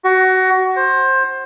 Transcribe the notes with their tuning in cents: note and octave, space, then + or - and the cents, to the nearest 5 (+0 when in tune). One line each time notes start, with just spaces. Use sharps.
F#4 +20
C5 +20